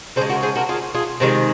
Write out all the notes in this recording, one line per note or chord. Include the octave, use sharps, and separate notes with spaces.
C#3 G#4 C5
G#3
F#4 A#4
G#4 C5
F#4 A#4
F4 G#4
F4 G#4
C3 D#3 G#3 G#4 C5